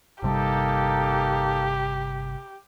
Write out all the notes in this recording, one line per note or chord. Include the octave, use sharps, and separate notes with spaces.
G1 C3 G3 A#3 D#4 G4 A4